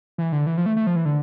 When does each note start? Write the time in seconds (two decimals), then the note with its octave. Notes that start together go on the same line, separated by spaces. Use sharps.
0.18 E3
0.32 D3
0.46 E3
0.57 F3
0.66 A3
0.76 A3
0.87 F3
0.96 E3
1.05 D3